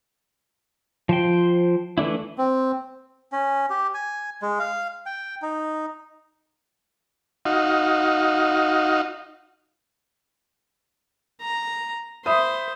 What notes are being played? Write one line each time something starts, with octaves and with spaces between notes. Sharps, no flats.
F3 C5 G5
E3 A3 D4 E4
C4
C#4
G4
G#5
G#3
F5
G5
D#4
D#4 F#4 F5
A#5
C5 E5 B5 D#6